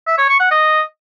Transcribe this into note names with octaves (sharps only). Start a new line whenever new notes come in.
E5
C#5
C#6
F#5
D#5